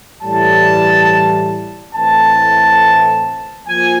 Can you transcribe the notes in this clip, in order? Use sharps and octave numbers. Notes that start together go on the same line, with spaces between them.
A2 E3 G3 A5
A2 E3 A3 C4 A5
F3 A#3 G#5